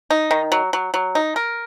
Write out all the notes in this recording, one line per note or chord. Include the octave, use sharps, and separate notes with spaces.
D#4
D#3
F#3
F#3
F#3
D#4
A#4